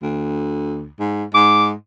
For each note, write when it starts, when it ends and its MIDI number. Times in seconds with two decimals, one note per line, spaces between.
0.03 0.89 38
0.99 1.24 44
1.34 1.73 44
1.34 1.66 86